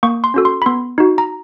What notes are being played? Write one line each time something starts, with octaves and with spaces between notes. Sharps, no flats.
A#3 C#6
C6
C#4 F#4 A4
C6
B5
B3 C6
D#4 F#4
A#5